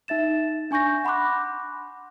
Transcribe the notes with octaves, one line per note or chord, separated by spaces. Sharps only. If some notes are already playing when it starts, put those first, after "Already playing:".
D#4 E5 A6 E7
D4 G#5 C#6 G6 A#6
F#5 B5 C6 D6 F#6